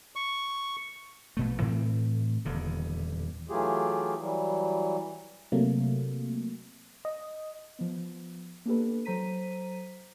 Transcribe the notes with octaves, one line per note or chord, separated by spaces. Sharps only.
C#6
A#1 B2 A3
A2 E3 A3 C4
D#1 E2 D3
E3 F#3 A3 F4 G4 G#4
E3 F#3 G3
C3 F#3 A3 A#3
D#5
F3 B3
A#3 B3 D4 G4 A4 B4
F#3 A4 C5 A#5 B6 D#7